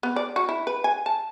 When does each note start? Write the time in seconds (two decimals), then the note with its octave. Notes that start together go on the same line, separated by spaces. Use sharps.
0.03 B3
0.16 D5
0.36 F#4
0.49 E4
0.67 B4
0.84 G#5
1.06 A5